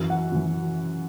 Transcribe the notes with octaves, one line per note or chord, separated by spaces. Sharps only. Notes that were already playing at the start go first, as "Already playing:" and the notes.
Already playing: F#2 E3
F#5
F#2 E3